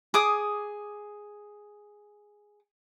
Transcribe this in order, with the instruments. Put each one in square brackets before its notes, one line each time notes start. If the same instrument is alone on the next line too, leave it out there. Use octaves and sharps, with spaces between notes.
[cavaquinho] G#4 D6 D#6